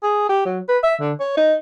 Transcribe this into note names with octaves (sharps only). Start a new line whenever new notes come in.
G#4
G4
F#3
B4
E5
D3
C#5
D#4